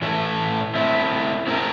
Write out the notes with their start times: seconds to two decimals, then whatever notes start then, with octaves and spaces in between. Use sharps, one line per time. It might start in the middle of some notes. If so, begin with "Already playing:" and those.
0.02 A2 E3 A3 E4 A4
0.75 A3 C4 E4
1.47 A3 C4 E4 A#4